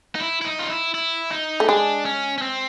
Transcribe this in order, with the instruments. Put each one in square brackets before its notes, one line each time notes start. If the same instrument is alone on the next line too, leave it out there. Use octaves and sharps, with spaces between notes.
[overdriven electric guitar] D#4
E4
E4
D#4
F4
E4
E4
D#4
[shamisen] A3
[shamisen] G#3 [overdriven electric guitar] D4
[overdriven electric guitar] C#4
C#4
C4